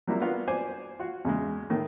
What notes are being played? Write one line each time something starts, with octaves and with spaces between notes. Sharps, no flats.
F#3 G3 A#3 E4 F4
B3 D4 F4 F#4 A#4
C5 D5 G#5 D6
F4 F#4
E2 C#3 G#3
A2 D#3